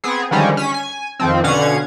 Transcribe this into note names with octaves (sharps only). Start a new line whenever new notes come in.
B3 C4 G#4
D3 D#3 F3 G3 G#3 C#4
C#4 B6
G#5
F2 D#3 F3 C4
B2 D3 C#4 F5 F#5 G#6